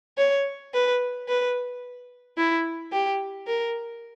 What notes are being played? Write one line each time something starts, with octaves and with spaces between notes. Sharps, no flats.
C#5
B4
B4
E4
G4
A#4